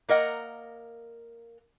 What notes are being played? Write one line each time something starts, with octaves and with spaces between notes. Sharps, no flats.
A#3 A#4 D#5 F#5